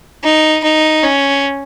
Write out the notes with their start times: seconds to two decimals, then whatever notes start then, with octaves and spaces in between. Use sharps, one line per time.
0.24 D#4
0.63 D#4
1.03 C#4